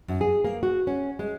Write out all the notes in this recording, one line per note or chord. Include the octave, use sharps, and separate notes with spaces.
F#2
G#4
A#3
F#4
C#4
G#3